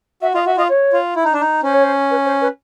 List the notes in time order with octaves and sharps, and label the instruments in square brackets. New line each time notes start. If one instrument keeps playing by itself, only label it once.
[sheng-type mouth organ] F#4 [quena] E5
[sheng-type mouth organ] F4 [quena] D#5
[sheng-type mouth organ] F#4 [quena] E5
[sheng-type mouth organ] F4 [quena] D#5
[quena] C#5
[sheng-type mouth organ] F4
E4
D#4
D4
D#4
[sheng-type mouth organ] C#4 [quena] C5
[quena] C#5
C5
B4
C5
B4